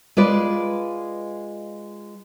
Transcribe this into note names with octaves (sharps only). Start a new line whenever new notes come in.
G#3 F4 B4 D5